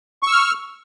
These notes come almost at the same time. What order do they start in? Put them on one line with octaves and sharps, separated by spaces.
C#6 E6 F6